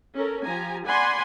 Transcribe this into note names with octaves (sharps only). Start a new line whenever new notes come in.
C#4 A4 A#4
F3 G4 G#5 A#5
D5 F#5 G#5 B5 C6